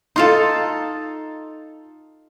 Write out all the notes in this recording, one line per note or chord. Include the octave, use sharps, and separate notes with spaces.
D#4 F4 A4 F5 C6